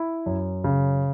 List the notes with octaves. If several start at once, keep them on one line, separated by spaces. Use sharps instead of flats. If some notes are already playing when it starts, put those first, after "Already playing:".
Already playing: E4
F#2
C#3